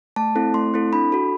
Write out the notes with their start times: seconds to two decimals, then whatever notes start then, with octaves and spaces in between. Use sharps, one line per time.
0.16 A3 A5
0.35 C4 E4 A4
0.54 A3 C6
0.74 C4 E4 A4
0.93 D4 B5
1.12 F#4 A4